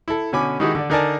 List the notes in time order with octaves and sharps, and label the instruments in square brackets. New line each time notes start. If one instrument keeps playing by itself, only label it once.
[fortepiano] E4 A4
B2 D3 C#4 G#5 B5 D6
D#3 G#3 D#4 E4 F#4 G4
D3 D5
D3 D#4 A#4 D5 G#5 A5